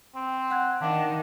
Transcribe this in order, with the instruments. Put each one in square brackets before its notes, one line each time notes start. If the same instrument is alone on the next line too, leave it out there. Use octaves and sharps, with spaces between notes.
[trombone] C4
[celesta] F#5 F#6 G#6
[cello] D#3 [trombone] D4 [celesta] F5 F#5 D6